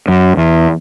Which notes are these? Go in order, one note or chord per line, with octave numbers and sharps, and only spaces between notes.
F#2
E2